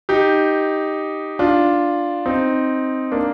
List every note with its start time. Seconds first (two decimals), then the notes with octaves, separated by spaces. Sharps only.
0.09 D#4 G4
1.39 D4 F4
2.26 C4 D#4
3.12 A#3 D4